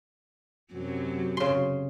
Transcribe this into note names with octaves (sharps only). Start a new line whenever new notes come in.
F#2 C3 F#3
C#3 C6